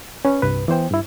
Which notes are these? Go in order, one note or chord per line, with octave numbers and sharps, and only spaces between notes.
C#4 B4
C2 G2 B4
E3 B3 C5 G5
G2 E4